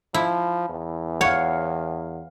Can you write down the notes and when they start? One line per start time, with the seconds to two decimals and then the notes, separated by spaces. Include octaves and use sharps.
0.14 F3 E4
0.69 E2
1.21 C#5 F5 F#5